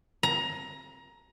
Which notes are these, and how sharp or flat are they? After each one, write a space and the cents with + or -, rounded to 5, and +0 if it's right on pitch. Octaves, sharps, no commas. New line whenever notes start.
A#5 +20